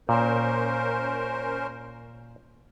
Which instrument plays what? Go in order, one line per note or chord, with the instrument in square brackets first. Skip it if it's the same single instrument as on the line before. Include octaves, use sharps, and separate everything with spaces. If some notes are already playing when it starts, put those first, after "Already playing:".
[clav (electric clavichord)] A#2 [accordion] C#4 A#4 C5